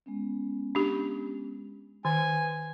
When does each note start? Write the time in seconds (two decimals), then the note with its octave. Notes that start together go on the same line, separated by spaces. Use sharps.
0.06 G#3 B3 C#4
0.75 D4 G4
2.05 D#3 B4 G#5